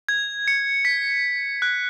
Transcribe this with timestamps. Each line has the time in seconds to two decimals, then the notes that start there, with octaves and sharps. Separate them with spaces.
0.09 G#6
0.48 C#7
0.85 B6
1.62 F#6